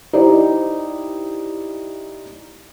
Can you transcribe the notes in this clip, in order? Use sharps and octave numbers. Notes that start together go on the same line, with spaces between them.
D#4 E4 G4 C5 D5